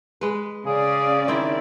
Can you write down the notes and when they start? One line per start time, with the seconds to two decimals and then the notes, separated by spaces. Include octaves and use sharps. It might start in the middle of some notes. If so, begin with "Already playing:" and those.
0.21 G#3 B4
0.66 C#3 G#4 D5 F5
1.28 D#3 C4 E4 E5